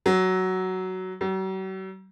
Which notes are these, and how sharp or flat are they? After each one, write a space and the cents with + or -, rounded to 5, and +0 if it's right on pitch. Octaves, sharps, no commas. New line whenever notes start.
F#3 +10
F#3 +45